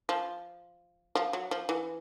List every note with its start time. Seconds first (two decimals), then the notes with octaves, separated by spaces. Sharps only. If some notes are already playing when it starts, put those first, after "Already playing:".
0.09 F3
1.15 F3
1.33 F#3
1.51 F3
1.69 E3